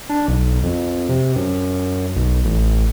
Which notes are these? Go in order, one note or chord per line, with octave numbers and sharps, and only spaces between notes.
D4
B1
F2
C3
F#2
B1
A1